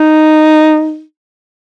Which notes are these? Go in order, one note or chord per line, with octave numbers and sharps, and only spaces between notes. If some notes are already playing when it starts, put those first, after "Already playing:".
Already playing: D#4